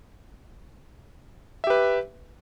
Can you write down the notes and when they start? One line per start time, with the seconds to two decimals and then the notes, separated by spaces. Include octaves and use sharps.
1.64 E5
1.67 G4
1.70 B4